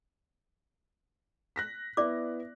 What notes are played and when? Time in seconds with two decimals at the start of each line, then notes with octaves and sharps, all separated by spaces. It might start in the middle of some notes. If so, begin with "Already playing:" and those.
1.56 F#6 A#6 B6
1.97 B3 E4 D5 D6